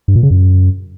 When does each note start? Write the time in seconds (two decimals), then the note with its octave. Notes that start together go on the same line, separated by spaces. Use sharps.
0.08 G2
0.16 A#2
0.23 C#3
0.31 F#2